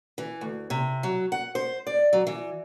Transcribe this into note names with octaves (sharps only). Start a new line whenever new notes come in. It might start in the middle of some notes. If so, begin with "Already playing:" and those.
E3
D2
C3
F#3
F#5
C5
D5
F#3
E3